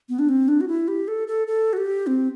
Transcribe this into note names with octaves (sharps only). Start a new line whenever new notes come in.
B3
D4
C4
D4
F#4
E4
G4
A4
A4
A4
F#4
G4
C4